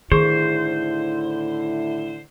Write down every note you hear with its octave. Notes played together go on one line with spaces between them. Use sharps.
A2 D3 D#3 E4 G#4 C5 C#6